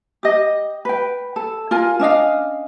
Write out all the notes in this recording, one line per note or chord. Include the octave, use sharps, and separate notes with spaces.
G4 D#5
B4 G5
A4
F4 A#4 G#5
C#4 D4 D#5 F5